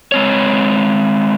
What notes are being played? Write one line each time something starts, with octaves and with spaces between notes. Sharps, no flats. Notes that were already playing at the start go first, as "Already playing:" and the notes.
G#3 C4 C#5